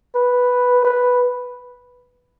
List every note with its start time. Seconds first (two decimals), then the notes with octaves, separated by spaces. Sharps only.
0.15 B4
0.84 B4